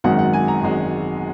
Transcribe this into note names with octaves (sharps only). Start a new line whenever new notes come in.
G#1 F#2 D#3 G#3 F#5
F#5
G#5
A#5
G#1 F#2 D#3 G#3